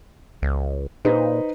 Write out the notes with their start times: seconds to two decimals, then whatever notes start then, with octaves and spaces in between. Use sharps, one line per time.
0.42 C#2
1.05 A#2 D#4 B4 C5